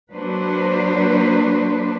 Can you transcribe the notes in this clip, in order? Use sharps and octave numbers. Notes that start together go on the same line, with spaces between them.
F#3 A#3 D4 B4 C5